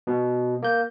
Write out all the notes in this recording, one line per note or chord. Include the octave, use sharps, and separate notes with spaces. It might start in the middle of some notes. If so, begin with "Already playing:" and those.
B2
A#3 G6